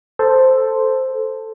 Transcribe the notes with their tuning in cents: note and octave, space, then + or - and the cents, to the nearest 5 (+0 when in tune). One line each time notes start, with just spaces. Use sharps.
A4 +5 C5 +0